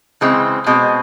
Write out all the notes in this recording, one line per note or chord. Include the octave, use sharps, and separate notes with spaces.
C#3 E3 G#3 C4
B2 G#3 C4